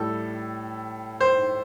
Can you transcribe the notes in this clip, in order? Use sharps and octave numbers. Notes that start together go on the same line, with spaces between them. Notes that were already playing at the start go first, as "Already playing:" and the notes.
Already playing: A2 G3 A4
C5